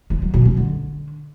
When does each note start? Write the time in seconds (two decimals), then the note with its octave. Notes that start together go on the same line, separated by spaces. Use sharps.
0.10 G#3
0.22 F#3
0.34 B2
0.45 C#4
0.57 D3